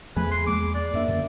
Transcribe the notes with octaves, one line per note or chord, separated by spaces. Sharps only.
E2 F3 A3 G#4 B4 G#5
C6
E2 G#3 A#3 D6
D5
F#2 A#3 D4 E5
F#2 D3